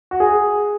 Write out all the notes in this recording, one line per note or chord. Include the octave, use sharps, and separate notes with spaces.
F#4
G#4